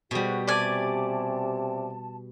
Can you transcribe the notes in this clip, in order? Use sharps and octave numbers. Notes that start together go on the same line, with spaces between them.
B2 G3 F#4 G#4 C5
C3 D5 G#5 A5